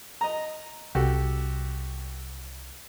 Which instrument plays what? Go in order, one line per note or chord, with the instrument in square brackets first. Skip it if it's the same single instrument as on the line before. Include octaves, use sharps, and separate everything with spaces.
[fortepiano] D#5 A#5
[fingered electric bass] C2 [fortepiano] F#4 G4 A4